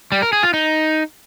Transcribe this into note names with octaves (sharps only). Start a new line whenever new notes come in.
G3
A#4
G#4
F4
D#4